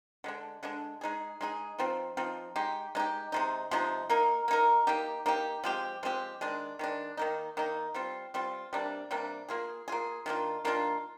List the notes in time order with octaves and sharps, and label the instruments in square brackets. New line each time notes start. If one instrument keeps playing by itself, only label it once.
[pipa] D3 G#3 D4
D3 G#3 D4
G#3 D#4 G#4
G#3 D#4 G#4
F3 C4 D#4
F3 C4 D#4
G#3 D#4 G4
G#3 D#4 G4
C3 F3 G#3 D#4
C3 F3 G#3 D#4
A#3 D#4 A#4
A#3 D#4 A#4
A#3 D#4 G4
A#3 D#4 G4
F3 G#3 C4 G4
F3 G#3 C4 G4
D#3 G#3 D4
D#3 G#3 D4
D#3 A#3 D#4
D#3 A#3 D#4
G3 C4 F4
G3 C4 F4
C3 G3 A#3 D4
C3 G3 A#3 D4
A#3 F4 G#4
A#3 F4 G#4
D#3 A#3 D4 F4
D#3 A#3 D4 F4